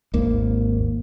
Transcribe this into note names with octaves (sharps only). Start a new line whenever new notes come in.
G#1 D#2 A#3